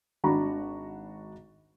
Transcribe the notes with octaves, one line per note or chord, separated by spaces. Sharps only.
G#1 D4 F#4 A#5 B5 C#6